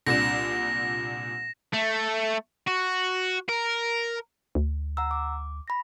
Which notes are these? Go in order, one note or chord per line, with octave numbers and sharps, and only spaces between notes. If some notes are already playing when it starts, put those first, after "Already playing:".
C2 A#2 D4 A#6 E7
A3
F#4
A#4
D2
F#5 A#5 E6
D6
B5 A#6